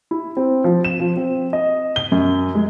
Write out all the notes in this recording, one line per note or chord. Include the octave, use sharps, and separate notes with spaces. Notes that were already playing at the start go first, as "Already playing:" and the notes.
E4
C4
F3
E7
F3
C4
D#5
G7
F#2
G#3